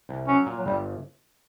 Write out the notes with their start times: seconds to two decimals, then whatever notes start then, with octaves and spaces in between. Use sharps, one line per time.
0.09 C2
0.28 F#3 C#4
0.46 A#2
0.59 F#3
0.66 G1 G3